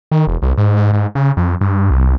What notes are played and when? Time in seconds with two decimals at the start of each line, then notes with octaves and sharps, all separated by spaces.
0.12 D#3
0.27 E1
0.42 C2
0.58 G#2
0.77 G#2
0.93 G#2
1.15 C#3
1.37 F2
1.61 G2
1.90 C2